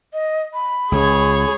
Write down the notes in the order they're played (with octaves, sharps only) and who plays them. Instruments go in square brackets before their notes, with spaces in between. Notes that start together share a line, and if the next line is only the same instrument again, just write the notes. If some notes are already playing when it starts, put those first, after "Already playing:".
[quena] D#5
B5
[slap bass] C#2 [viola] G#4 C#5